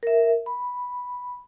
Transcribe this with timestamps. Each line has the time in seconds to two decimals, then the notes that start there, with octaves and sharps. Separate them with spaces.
0.03 A#4 E5
0.46 B5